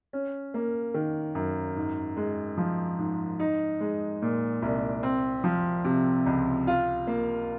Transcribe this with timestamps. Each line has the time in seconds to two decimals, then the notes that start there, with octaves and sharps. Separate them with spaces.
0.13 C#4
0.54 A#3
0.94 D#3
1.35 F#2
1.76 G#2
2.17 G#3
2.58 F3
2.98 G#2
3.40 D#4
3.81 G#3
4.22 A#2
4.62 C2
5.03 C4
5.44 F3
5.85 C3
6.26 C#2
6.67 F4
7.07 A#3